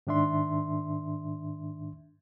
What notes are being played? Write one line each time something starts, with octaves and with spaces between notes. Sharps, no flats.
G#2 D#3 D4 E5 C6